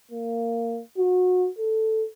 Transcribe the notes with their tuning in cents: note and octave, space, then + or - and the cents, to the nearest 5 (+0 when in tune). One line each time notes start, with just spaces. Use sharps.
A#3 -15
F#4 -25
A4 +0